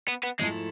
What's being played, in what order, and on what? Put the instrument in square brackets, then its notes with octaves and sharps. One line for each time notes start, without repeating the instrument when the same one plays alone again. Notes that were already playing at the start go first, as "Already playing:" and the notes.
[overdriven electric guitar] B3
B3
[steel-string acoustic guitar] G#2 F3 A3 E4 A4 [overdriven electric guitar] G#3